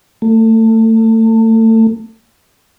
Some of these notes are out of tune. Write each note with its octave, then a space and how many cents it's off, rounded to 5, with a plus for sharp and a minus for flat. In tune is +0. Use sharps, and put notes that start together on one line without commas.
A3 +30